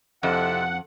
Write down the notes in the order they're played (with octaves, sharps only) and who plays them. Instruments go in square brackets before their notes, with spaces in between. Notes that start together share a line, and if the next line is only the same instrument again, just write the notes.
[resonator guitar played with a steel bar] F2 [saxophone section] C3 E4 A4 [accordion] F#5